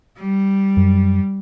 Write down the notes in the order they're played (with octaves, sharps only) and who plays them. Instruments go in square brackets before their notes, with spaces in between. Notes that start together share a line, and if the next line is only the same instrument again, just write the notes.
[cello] G3
[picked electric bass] F#2